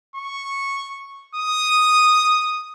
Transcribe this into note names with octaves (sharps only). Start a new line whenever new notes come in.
C#6
D#6